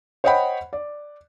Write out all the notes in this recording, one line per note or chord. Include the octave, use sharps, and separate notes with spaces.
C5 C#5 D#5 F#5 G5 B5
D5